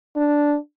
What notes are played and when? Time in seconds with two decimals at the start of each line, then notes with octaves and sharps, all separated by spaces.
0.16 D4